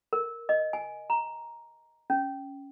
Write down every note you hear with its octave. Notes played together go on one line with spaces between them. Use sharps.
A#4
D#5
G#5
A#5
C#4